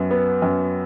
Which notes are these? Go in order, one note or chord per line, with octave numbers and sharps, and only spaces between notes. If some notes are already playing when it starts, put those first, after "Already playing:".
Already playing: F#2 B3
B3
F#2